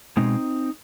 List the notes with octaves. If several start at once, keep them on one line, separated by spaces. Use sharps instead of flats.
B2 G#3 C4 D#4